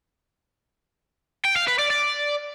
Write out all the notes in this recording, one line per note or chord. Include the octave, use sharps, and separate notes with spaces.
G5
F5
B4
D5
D5